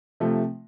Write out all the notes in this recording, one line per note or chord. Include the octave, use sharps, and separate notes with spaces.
C3 F3 A3